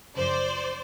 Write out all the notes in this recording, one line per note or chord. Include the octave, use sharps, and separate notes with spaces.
F#2 C#3 F3 C5 D5